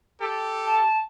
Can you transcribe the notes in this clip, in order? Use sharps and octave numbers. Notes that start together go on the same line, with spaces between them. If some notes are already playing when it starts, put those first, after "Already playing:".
G4 A4
A5